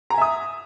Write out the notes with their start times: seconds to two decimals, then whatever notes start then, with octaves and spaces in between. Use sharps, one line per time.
0.10 A#5
0.14 G#5
0.18 E5
0.22 D#6